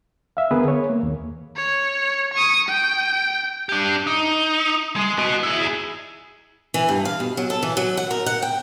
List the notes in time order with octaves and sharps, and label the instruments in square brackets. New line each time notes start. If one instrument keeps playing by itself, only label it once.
[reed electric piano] E5 F5
D3 B3 G#4 A#4 B4
C#5
A#3
D#2
[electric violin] C#5
C#6 D#6
G5
[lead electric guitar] D4 G4
D#4
G#3
F#4 D#5
E4 G#4
[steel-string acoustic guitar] E3
G2
F5
B2
F#3
A4
E3
F#3
F#5
A#4
F#5
G5